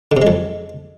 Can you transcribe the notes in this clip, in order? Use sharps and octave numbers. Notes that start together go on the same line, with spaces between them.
D3
C3
G#3
F2